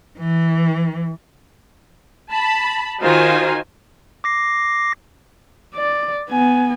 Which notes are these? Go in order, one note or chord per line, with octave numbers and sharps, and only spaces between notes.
E3
A5 B5
D#3 D#4 F4 F#4 C5 G#5
D6 A#6 C7
D5
B3 G#5